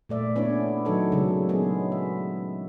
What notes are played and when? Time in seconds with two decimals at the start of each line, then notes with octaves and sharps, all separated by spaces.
0.09 A#2 A3 D5 E5
0.36 B3 C#4 D4 E4 C#5
0.85 D#3 F#3 D#4 A4 C#5
1.12 C#3 F#3 G#3
1.49 G#3 B3 C#4 G#4
1.92 E5